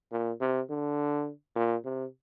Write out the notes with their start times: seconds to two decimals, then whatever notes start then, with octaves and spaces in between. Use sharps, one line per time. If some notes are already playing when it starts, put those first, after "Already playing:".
0.12 A#2
0.41 C3
0.70 D3
1.56 A#2
1.85 C3